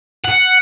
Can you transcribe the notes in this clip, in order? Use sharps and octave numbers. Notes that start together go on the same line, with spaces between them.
F#5